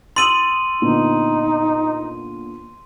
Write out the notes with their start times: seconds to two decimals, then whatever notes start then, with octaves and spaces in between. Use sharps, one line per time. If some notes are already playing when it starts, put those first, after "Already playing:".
0.16 C6 D#6 E6 A6 D#7 F#7
0.82 A#2 D3 B3 D#4